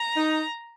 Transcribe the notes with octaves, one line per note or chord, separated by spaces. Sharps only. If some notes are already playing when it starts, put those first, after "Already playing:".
Already playing: A#5
D#4